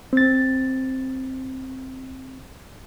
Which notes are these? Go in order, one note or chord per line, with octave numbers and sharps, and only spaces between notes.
C4 A6